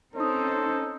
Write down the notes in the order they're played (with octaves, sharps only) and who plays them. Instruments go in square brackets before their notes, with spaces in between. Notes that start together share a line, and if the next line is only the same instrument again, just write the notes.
[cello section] C4 C#4 D#4 [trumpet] A4 [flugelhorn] C5 [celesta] D#5 D#6